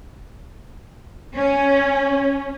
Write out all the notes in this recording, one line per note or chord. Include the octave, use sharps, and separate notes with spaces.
C#4